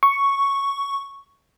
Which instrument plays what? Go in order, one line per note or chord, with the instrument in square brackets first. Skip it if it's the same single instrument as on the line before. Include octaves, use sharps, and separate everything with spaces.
[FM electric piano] C#6